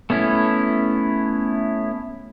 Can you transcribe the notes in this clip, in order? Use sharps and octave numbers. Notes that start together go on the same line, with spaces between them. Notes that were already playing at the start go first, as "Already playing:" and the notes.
A3 B3 C#4 E4